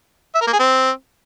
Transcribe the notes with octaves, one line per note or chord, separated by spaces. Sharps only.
E5
A#4
A#3
G#4
C4